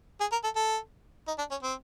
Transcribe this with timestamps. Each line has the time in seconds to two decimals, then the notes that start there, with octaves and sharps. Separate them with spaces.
0.21 G#4
0.32 A#4
0.44 A4
0.56 A4
1.28 D#4
1.38 D4
1.51 C#4
1.63 C4